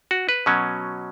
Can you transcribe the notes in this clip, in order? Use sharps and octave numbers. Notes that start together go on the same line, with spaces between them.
F#4
B4
B2 F#3 C#4